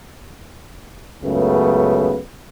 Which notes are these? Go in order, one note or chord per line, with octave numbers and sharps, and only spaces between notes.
C#2 F#2 C#3 A3 B3